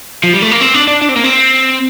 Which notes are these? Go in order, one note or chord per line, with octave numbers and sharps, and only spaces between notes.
F3
G3
A3
A#3
C4
D4
D4
D4
C4
A#3
C4